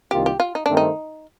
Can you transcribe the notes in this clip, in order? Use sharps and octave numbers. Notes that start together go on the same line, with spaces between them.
C2 C3 D#3 A#3 F4 G4
G4
F4
D#4
G2 D#3 A3 C4 D4
D#4